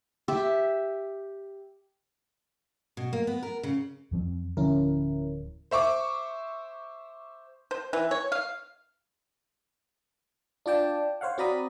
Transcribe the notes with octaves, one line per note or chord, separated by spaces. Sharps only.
G4 E5
B2
A#3
B3
A#4
C#3
F2 F3 C4
D1 D3 F3 C#4 E4 A#4
C5 E5 C#6 D6
C5
E3
C#5
F5
D4 F4 D5 G5 A5
C5 C#5 F5 F#5
C4 F#4 D5 A#5 B5 D#6